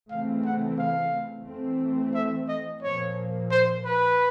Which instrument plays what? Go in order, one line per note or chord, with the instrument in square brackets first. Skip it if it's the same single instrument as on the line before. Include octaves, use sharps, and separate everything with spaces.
[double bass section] C#3 E3 A3 C4 [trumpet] F5
[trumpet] F#5
F5
[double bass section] E3 A3 C4
[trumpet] E5
D#5
[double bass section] A#2 F3 A#3 [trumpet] C#5
[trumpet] C5
B4